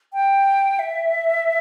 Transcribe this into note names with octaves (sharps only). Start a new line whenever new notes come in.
G5
E5